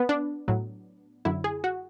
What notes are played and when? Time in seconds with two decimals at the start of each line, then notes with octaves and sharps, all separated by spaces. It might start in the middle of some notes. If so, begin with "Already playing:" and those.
Already playing: B3
0.09 D4
0.48 A2 F#3
1.25 F#2 D3 F#3 E4
1.44 G#4
1.64 F#4